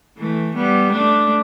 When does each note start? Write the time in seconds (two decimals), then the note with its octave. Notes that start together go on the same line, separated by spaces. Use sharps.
0.18 E3 A3
0.55 G3 B3
0.91 A3 D4